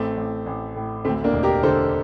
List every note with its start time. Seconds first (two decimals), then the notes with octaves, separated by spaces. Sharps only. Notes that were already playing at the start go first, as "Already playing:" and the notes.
Already playing: A1 A3 C4
0.17 A1
0.46 A1
0.76 A2
1.05 D2 A3 C4
1.24 A#3 D4
1.33 E1
1.43 G4 A#4
1.63 D3 A4 C5